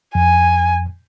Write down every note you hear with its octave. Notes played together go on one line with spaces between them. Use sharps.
F2 G#5